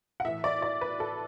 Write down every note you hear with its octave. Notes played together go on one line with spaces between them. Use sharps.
F#5
A2 E3 E5
D5
D5
B4
A4